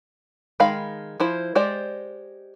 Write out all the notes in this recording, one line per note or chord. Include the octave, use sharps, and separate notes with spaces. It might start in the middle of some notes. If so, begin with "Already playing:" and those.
D#3 G#3 F5 B5
F3 E4 C5
G#3 G4 C5 D5